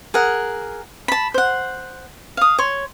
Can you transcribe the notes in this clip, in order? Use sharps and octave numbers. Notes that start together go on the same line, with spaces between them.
G#4 A#4 F#5
A5 B5
C5 F#5
F5 D#6
C#5 C6